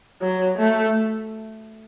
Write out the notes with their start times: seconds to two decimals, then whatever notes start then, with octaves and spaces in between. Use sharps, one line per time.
0.22 F#3
0.58 A3